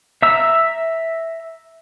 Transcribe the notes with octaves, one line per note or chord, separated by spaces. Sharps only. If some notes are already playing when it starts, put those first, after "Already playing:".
E5 A#5 E6